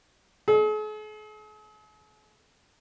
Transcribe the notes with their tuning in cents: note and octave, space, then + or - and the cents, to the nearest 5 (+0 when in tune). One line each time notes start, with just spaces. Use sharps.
G#4 +45